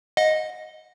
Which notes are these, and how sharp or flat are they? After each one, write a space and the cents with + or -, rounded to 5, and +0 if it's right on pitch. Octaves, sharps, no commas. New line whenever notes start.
D#5 +0 F#5 -30